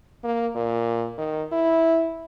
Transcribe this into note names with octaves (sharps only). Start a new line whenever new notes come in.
A#3
A#2
D#3
E4